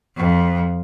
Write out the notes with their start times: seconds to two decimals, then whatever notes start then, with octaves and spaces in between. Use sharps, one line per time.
0.16 F2